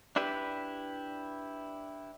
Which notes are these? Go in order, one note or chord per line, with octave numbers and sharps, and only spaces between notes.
D4 E4 G4 B4